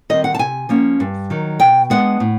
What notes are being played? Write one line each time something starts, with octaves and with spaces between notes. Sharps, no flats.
D#3 G3 C4 D#5
F#5
A5
C3 G#5
F3 A#3 C#4
G2
D#3 F#3
B2 G5
G#3 B3 D4 F#5
A2